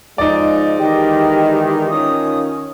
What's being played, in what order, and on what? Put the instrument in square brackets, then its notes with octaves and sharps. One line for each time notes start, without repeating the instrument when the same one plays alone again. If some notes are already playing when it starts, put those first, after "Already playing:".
[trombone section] G#2 F3 G#3 [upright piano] D#4 D5
[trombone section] D#3 E3 G#3 [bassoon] G4 [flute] D#5
[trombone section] D#3 C#4 F4 [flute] D#6